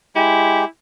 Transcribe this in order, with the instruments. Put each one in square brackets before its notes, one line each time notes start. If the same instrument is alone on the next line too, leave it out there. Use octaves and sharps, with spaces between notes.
[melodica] G#3 G4 [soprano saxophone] E4